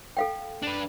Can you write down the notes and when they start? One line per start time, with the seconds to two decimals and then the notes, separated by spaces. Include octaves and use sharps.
0.17 A4 F5 G5
0.63 D4 B4